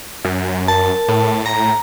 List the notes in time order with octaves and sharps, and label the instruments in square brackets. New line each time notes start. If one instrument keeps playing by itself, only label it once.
[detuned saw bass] F#2
[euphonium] A#4 [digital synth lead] A5
[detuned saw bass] A2
[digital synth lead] A#5